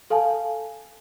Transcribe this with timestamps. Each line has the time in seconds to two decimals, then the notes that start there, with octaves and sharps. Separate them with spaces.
0.10 A4 F5 G#5 A5